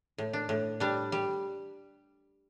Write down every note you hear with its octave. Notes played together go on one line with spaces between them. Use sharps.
A2
D4
A2
G3 D4
G3